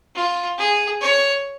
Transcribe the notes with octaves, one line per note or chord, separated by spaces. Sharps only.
F4
G#4
C#5